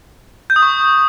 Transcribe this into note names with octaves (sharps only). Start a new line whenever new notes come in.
G6
D#6
C#6